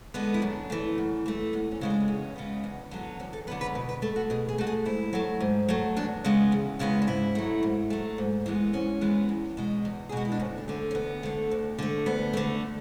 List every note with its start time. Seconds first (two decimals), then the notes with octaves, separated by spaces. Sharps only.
0.14 D3 G#3 B3
0.34 E4
0.42 F#2 D4
0.70 E3 A3
0.98 F#2
1.26 E3 A3
1.53 E2 B3
1.71 C#4
1.81 C#3 G#3 B3
1.90 D4
2.00 B3
2.08 E2 C#4
2.36 C#3 G#3 B3
2.64 E2
2.91 D3 F#3 B3
3.20 E2 C#4
3.33 A4
3.47 D3 F#3 B3 B4
3.61 B4
3.75 B2 B4
3.89 B4
4.02 A3 A4
4.16 F#4
4.30 B2 G#4
4.49 G#4
4.58 A3 F#4
4.67 G#4
4.86 G#2 E4
5.13 F#3 A3
5.40 G#2
5.69 F#3 A3
5.97 E2 D4
6.24 C#3 G#3 B3
6.52 E2
6.79 C#3 G#3 B3 E4
7.02 D4
7.07 G#2 E4
7.35 F#3 A3
7.63 G#2
7.90 F#3 A3
8.18 G#2
8.46 E3 G#3 B3
8.73 G#2 C#4
9.01 E3 G#3 B3
9.29 E2
9.57 B2 G#3
9.85 E2
10.09 G#4
10.12 B2 G#3 F#4
10.25 E4
10.32 D4
10.40 D2 C#4
10.58 D4
10.68 D3 A3
10.91 C#4
10.95 D2 B3
11.23 D3 A3
11.51 D2
11.79 D3 A3
12.06 D2 B3
12.33 D3 A3